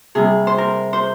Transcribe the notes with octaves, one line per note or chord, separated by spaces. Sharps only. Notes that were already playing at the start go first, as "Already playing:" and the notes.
C3 G3 G#4
C5
A#4
C5